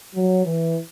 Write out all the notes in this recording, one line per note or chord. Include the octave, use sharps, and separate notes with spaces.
F#3
E3